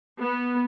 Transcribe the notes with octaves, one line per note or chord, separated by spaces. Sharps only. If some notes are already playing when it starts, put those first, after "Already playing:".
B3